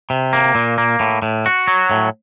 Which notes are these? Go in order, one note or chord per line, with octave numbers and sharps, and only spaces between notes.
C3
A#3
A#2
A#3
A2
A2
F#4
F#3
A2